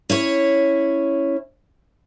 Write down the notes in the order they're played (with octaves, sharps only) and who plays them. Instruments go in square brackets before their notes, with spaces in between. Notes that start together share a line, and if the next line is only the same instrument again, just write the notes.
[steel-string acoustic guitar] C#4 E4 C#5